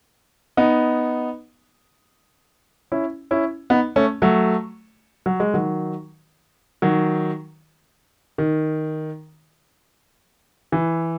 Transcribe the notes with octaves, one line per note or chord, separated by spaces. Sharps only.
B3 D#4
C#4 E4
C#4 E4
B3 D#4
A3 C#4
F#3 A3
F#3
G#3
D#3 F#3
D#3 F#3
D#3
E3